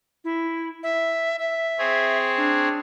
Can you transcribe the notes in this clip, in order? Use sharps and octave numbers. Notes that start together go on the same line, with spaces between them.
E4
E5
E5
C4 G#4 C#5
D4